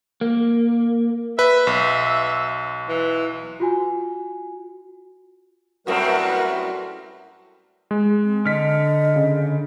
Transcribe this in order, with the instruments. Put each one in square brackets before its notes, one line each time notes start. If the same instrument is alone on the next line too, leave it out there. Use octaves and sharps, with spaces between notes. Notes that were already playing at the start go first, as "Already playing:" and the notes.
[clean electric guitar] A#3
[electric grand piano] B4 [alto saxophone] E5
[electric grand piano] B1
[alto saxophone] E3
[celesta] F4 F#4 G#5
[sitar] F#2 A2 C4 [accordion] G3 A#4 B4 [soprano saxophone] F#4
[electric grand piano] G#3
[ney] C4
[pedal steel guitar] D3 [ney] D#5 [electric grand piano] F6 B6
[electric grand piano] C#3